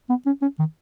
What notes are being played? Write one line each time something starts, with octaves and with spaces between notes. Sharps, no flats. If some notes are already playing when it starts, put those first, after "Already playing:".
B3
C#4
C#4
D#3